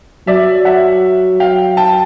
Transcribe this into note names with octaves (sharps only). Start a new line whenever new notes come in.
F#3 D5 E5
E5 F#5
F5 G5
G5 A5